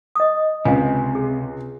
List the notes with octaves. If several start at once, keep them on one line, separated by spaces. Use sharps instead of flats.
D#5 D#6
C#2 C3 F5 G#5
G#4